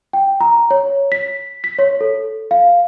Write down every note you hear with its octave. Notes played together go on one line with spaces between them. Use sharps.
G5
A#5
C#5
B6
B6
C#5
A4
F5